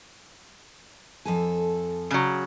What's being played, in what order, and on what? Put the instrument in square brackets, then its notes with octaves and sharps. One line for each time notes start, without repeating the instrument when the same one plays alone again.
[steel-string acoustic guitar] F2 A4 G#5
[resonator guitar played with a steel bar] C#3 F#3